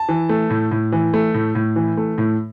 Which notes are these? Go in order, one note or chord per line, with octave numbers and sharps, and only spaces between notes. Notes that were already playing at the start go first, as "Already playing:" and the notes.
Already playing: A5
E3
A3
A2
A2
E3
A3
A2
A2
E3
A3
A2